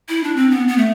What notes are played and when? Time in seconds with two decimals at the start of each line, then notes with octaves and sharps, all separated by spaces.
0.09 E4
0.23 D4
0.36 C4
0.51 B3
0.68 B3
0.78 A3